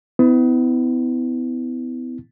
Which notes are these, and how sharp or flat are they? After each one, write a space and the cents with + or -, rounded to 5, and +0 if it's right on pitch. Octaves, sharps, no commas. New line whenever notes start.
B3 +35 E4 -20